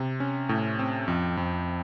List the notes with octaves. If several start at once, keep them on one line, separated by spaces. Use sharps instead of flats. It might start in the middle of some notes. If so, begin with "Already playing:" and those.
Already playing: C3
C#4
A2
C4
F2
F2